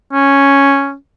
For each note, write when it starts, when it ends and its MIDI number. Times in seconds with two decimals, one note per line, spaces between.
0.13 0.94 61